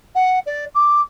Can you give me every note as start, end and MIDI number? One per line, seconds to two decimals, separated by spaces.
0.15 0.39 78
0.46 0.65 74
0.74 1.01 86